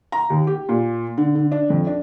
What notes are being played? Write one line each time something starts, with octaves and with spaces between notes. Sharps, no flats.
A#5
D#2
G4
A#2
D3
D3
D4
F2
D4